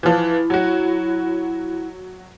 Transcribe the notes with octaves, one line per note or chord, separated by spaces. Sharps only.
E3 F3 E4
F#3 F#4